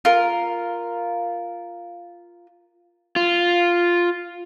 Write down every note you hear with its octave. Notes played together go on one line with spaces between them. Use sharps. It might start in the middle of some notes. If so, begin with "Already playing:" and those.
F4 A#4
F4